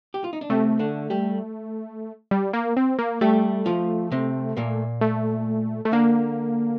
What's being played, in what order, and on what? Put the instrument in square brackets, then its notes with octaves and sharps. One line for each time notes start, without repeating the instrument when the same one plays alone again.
[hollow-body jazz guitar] G4
F4
D#4
D4
[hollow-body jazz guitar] C3 C4 [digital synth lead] A3
[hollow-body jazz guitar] D3 D4
G3 G4
[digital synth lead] G3
A#3
C4
A#3
[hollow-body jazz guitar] G3 G4 [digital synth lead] A3
[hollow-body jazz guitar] F3 F4
C3 C4
A#2 A#3
[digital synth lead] A3
A3
[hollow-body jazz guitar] D3 D4 [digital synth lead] A#3